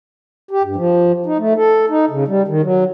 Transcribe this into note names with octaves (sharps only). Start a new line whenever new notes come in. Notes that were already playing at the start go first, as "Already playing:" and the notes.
G4
G2
F3
D#4
A3
A4
D#4
C#3
G3
D#3
F#3